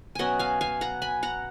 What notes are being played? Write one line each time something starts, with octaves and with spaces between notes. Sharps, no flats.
B2 F#3 C#4 D#5 F#5 G#5
F5 G#5
F5 G#5
F#5 A#5
G#5 B5
F#5 A#5